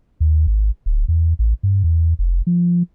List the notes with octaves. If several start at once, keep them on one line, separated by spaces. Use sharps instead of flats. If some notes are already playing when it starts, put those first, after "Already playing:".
D#2
G#1
D1
E2
A1
G2
E2
F1
F3